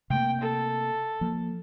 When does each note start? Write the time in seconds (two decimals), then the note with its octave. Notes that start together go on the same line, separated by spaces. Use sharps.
0.10 C3 A3 A#3 G5
0.41 A4
1.21 F3 A#3